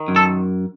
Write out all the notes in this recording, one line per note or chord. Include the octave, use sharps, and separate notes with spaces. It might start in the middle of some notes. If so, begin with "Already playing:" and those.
Already playing: D#3
F#2
A4